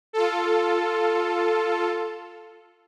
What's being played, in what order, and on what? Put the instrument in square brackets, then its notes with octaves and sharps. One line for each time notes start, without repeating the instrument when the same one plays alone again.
[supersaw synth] F4 A4